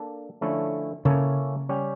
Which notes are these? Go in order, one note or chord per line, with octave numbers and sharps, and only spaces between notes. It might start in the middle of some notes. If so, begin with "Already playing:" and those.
Already playing: A#3 D4 A4
D3 F3 A3 C#4 E4
C#3 A#3 C#4 E4 A4 C#5
G3 C#4 G4